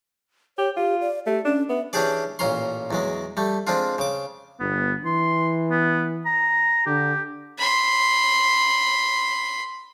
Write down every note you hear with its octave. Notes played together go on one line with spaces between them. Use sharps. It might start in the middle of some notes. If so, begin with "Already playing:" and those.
G4 C#5
F4 G4
D5
A3 G4
C#4 D4
B3 E5
E3 C#4 D4 G4 G#4 D5
A1 A#2 C#4 A#5 C6
E2 F#3 G#3
G3 A3
G#3 C4 D4 F4
C#3 D6
G1 B3
E3 C6
B3
A#5
D3 G4
B5 C6